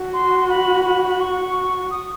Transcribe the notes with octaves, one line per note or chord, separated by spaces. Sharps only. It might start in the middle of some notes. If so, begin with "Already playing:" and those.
Already playing: F#4
C6
B5
B5
C#6
D#6